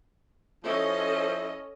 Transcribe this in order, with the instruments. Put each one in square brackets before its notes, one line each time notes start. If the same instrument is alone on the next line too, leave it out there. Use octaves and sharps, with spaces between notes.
[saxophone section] F3 E4 C5 [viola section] C#4 A4 D#5